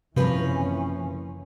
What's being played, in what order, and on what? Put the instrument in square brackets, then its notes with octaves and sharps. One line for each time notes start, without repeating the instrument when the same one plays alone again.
[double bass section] F#1 E3 C#4 [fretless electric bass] C3 [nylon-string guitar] F3 A#4 B4